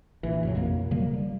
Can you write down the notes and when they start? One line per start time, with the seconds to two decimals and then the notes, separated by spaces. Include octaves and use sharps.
0.23 A#1 E3
0.43 F#2 C#3 F#3
0.55 F2 B2 A#3
0.91 C#3 F#3 G3 A#3
1.13 G3